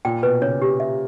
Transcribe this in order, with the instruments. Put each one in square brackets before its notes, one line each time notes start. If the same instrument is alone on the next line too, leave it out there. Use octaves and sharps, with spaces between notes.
[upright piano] A#2 [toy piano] G5
[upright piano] B2 [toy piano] B4
[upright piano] C#3 [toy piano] C#5
[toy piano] G4
E5